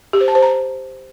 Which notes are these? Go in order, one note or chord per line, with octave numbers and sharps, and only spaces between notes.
G4
C5
A5
C5
A#5